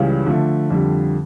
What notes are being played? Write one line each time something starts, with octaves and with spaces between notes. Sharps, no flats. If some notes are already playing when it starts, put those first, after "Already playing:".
Already playing: C#2 C#3 E3 G3
D3 F3 A3
F2 D3 G3